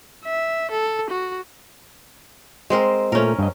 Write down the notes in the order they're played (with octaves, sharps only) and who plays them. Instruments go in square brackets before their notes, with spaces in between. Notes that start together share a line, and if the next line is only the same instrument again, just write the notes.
[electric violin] E5
A4
F#4
[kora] G#3 C4 A#4
[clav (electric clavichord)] A#2 A3 [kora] C#4 A#4
[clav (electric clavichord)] G2 D#5